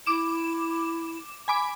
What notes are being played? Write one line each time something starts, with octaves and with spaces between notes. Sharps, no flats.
E4 D6 E7
G#5 B5 D6